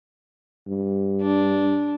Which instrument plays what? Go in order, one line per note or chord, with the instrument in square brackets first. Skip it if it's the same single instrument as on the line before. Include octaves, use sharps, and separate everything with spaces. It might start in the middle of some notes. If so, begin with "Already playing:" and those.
[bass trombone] G2
[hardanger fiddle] D4